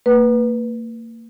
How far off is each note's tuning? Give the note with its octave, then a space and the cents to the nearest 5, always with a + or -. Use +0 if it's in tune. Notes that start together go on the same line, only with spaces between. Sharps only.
A#3 -35 B4 -10